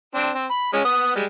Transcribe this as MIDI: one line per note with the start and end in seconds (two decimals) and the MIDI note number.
0.15 0.30 60
0.15 0.30 62
0.35 0.46 60
0.51 0.68 83
0.73 0.83 56
0.73 0.83 61
0.85 1.12 59
0.85 1.12 87
1.15 1.24 55
1.15 1.24 56